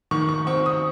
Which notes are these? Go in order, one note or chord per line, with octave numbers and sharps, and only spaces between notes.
D#3 C#6
C#6
C4 C#6
D#6